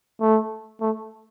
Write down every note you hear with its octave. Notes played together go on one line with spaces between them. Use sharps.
A3
A3